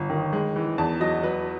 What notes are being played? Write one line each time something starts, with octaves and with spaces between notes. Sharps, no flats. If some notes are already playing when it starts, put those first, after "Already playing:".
Already playing: G1
D#3
G#3
E3
E2 A5
F#3 D#5
F#3 B4